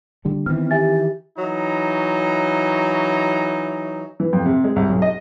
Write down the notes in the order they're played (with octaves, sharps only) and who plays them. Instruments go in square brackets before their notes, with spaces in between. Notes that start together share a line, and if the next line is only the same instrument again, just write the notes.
[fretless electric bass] D3 G3 A3
[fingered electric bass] D#3 E3 [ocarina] B3 [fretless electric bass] C4 [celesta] F6
[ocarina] G4 [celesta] E5 G#5 A6
[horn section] E3 F#3 D#4
[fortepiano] E3
F2
C3
G#3
C2
B1
D#5